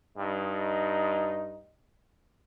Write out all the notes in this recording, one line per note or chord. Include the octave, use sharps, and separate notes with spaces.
G2 D#4